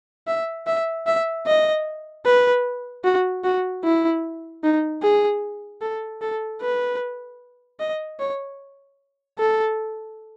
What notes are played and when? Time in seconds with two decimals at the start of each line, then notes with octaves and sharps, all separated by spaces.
0.28 E5
0.67 E5
1.07 E5
1.47 D#5
2.26 B4
3.04 F#4
3.44 F#4
3.84 E4
4.64 D#4
5.03 G#4
5.82 A4
6.22 A4
6.61 B4
7.80 D#5
8.20 C#5
9.39 A4